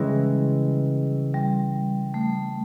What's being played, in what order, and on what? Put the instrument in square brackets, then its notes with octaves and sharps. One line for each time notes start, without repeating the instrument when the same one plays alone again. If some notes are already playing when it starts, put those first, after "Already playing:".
Already playing: [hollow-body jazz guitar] C#3 E3 G#3 [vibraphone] G3
[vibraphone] G3
A3